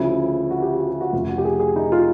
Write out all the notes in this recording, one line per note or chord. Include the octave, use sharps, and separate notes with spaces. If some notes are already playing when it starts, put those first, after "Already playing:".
Already playing: D2 C#3 F3 E4
F#4
G4
F#4
G4
F#4
F1 F2 C#3 F4
F#4
G4
G#4
G#4
D#4
F4